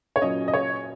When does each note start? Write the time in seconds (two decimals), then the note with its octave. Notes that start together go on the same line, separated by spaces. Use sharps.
0.16 C#5
0.22 A#2 F#3 C#4 D#5
0.48 D#5
0.53 C#5